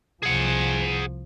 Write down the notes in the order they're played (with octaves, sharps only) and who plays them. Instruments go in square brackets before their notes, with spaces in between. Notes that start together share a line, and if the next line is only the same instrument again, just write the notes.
[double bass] C2 F3 [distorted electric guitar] G#4 F#5